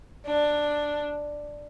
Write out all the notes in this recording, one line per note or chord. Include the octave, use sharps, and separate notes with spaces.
D4